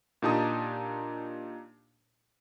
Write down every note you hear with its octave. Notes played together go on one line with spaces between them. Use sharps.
A#2 D4 D#4 G4 A5 D#6